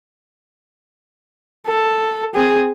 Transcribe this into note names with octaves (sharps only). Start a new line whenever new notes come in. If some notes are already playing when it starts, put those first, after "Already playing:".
A4
C4 G#4